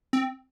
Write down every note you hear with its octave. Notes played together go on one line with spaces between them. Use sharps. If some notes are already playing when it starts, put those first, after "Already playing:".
C4